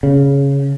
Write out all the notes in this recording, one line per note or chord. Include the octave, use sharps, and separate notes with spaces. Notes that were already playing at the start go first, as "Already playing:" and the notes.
C#3